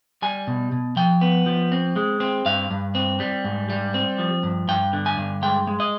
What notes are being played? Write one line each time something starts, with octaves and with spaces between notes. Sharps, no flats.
G3 G#5
B2
B2
F3 G5
B3
F3
C4
G#3
C4
G2 F5
G2
C4
G3
G#2
G3
C4
F3
G2
G2 G5
D3
G#5
G2
G#3 G5
G#3
D#5